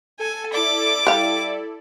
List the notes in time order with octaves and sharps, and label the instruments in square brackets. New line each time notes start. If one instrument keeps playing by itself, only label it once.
[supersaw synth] A4 [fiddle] G#5
[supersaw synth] E4 A4 D5 [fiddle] D6
[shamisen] G3 F5